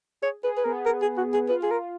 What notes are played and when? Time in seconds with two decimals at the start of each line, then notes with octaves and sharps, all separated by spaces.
0.22 G#4 C#5
0.43 G#4 B4
0.57 B4
0.65 B3 A#4
0.86 A#4
1.02 G#4
1.17 F#4
1.34 G#4
1.49 F4 B4
1.63 G#4
1.71 A#4